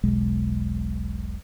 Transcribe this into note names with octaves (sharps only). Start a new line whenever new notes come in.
E1 B1 G#3